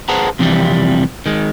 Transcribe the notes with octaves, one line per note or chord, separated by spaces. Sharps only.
G#4 B4 C5 F#5 A5 A#5
F2 C3 E3 F3 G3
D#3 G#3